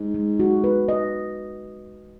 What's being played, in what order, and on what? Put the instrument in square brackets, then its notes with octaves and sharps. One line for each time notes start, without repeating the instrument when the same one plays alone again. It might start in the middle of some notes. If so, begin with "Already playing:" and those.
Already playing: [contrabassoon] G#2
[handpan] G#3
F#4
B4
D#5